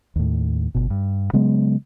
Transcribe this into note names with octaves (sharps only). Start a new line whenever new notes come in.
D#2 A2
G1 B2
G2
C#3 F#3 G#3 B3